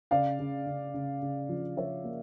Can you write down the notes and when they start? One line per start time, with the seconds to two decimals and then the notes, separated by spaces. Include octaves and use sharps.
0.11 C#3 D5 F5
0.39 C#3
0.66 C#3
0.94 C#3
1.22 C#3
1.49 F3
1.77 F3 C#5 E5
2.04 A#3